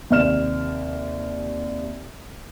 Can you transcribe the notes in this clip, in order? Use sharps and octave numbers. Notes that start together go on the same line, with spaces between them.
D#2 C3 D5 F6 E7